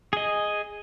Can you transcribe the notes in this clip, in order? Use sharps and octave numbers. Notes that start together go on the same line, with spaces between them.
G#4 D#5